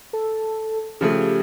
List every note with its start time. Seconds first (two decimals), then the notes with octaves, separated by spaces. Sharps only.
0.13 A4
1.01 C#3 F3 A3 G4